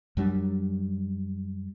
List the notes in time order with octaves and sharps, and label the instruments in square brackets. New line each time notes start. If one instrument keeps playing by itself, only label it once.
[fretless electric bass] F#2 F#3 G3 D4